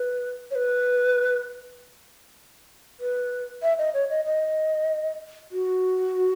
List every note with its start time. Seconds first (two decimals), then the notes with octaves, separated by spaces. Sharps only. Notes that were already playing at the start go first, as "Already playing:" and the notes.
Already playing: B4
0.51 C#5
0.55 B4
3.00 B4
3.63 E5
3.79 D#5
3.94 C#5
4.10 D#5
4.26 D#5
5.51 F#4